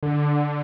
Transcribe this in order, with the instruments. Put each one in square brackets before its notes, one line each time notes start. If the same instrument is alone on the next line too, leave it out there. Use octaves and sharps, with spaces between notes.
[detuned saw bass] D3